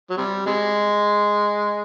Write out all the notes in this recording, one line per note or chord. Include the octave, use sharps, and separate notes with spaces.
F#3
C3 G3
C3 G#3